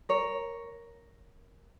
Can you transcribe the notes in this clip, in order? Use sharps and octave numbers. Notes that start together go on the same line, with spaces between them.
A#4 C#5